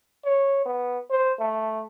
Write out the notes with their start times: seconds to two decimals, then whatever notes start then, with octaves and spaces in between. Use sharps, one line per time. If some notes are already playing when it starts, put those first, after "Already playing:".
0.25 C#5
0.66 B3
1.11 C5
1.39 A3